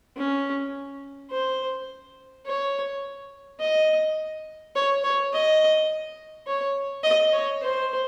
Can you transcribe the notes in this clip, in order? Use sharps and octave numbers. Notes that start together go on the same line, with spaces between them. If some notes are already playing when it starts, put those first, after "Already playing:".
C#4
C5
C#5
D#5
C#5
C#5
D#5
C#5
D#5
C#5
C5